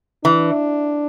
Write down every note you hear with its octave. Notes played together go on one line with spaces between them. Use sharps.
E3 D4